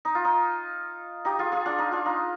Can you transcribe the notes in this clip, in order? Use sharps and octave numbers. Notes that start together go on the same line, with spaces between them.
D#4
F4
D#4
D#4 G4
F4 G#4
F4 G#4
D4 F4
D#4
D4 F4
D#4